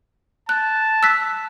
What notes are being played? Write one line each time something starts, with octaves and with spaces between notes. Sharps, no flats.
A5 F#6
E6 F#6 B6